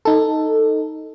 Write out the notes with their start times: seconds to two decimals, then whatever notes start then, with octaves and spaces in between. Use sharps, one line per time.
0.05 D#4 A4